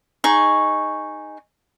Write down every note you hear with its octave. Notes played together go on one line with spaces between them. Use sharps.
D#4 G#4 C#6